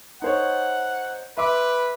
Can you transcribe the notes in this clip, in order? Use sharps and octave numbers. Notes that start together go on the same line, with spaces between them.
D#4 C5 C#5 F#5
B4 E5 C6 D6